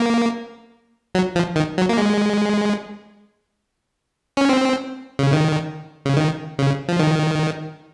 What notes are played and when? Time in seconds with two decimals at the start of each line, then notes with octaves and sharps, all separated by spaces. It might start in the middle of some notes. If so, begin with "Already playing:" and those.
Already playing: A#3
1.15 F#3
1.36 F3
1.56 D#3
1.78 F#3
1.89 A#3
1.98 G#3
4.37 C#4
4.49 C4
5.19 C#3
5.33 D#3
6.05 C#3
6.17 D#3
6.59 C#3
6.88 F3
6.99 D#3